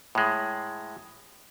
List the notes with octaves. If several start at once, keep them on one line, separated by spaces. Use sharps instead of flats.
A2 G#3